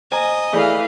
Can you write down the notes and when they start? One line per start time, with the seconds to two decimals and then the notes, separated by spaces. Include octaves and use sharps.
0.12 C5 D#5 G#5 A#5
0.53 E3 A3 G#4 D5 F5